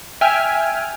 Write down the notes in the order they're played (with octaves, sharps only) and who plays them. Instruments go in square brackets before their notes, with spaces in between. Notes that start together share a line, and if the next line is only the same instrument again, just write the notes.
[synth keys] E5 G5 G#5 F6